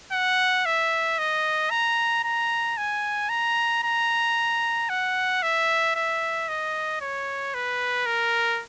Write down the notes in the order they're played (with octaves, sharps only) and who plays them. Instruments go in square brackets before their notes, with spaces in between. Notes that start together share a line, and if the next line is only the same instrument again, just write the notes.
[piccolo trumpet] F#5
E5
D#5
A#5
A#5
G#5
A#5
A#5
F#5
E5
E5
D#5
C#5
B4
A#4